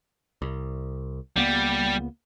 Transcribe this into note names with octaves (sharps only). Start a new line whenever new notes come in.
C2
C#2 G3 A#3 B3